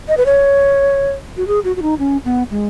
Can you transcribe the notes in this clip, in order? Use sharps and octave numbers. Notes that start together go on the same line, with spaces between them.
D#5
B4
C#5
F#4
G#4
F#4
F#4
D#4
C#4
B3
G#3